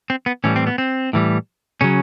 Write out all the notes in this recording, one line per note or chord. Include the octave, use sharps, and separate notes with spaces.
C4
B3
A2 E3 G3 C#4
C4
B3
C4
A2 E3 G3
C#3 F#3 C#4